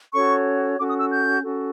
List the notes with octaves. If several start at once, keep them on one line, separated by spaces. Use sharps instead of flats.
C#4 F#4 A4 C#5 C#6
C#4 F#4 A4 D6
D#6
E6
G6
C#4 F#4 A4